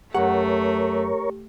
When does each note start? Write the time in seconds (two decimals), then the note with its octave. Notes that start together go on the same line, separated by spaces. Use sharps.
0.15 F#2 A3 G4 A#4 C#5 F#5